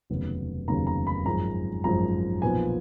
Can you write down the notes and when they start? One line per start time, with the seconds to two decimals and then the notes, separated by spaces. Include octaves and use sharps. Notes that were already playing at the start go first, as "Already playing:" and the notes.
0.10 F1 D#2 C#3 F#3 B3
0.68 F1 D#2 C#3 F#3 B3 A#5
0.87 A#5
1.07 B5
1.25 G#1 F#2 F3 G#3 A#5
1.83 G#1 F#2 F3 G#3 A#5
2.42 B1 A#2 F3 B3 G#5